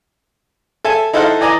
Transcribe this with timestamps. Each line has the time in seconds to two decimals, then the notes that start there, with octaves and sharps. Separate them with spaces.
0.85 A4 E5 G#5 A5
1.13 D#4 E4 A4 C5 F5 F#5
1.41 E3 D5 D#5 G#5 A#5 D6